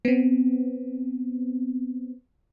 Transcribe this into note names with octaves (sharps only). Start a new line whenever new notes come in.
B3 C4